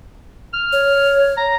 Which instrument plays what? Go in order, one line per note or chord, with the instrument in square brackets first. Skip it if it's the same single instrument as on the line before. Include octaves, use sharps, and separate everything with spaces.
[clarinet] F6
[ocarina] C#5
[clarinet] A#5